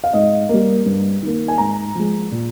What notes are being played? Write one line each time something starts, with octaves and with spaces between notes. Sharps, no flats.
F5
G#2 D#5
G3 A#3
G2
D#3 A#3
G#5
G#2 A#5
F3 G#3
A#2